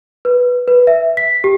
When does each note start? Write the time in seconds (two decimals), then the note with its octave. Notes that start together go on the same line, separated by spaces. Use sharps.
0.25 B4
0.68 B4
0.87 E5
1.17 B6
1.44 G4